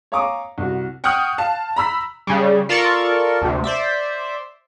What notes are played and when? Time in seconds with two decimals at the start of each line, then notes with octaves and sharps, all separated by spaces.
0.12 C#5 F5 G#5 A#5 D6 D#6
0.58 C2 F#4
1.04 F#5 G5 C#6 D#6 F6 F#6
1.38 F5 A5
1.76 A#5 B5 E6 B6
2.27 C#3 G3
2.69 F4 A4 A#4 D5 A5 C#6
3.42 D2 C3
3.64 C5 D5 E5